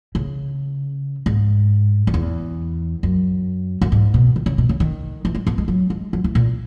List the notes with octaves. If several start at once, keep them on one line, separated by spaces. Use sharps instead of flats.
C#3
G#2
F#2
E2
F#2
F#2
G#2
B2
D#3
C#3
B2
C#3
D#3
E3
G#3
B3
G#3
F#3
G#3
F#3
E3
A#2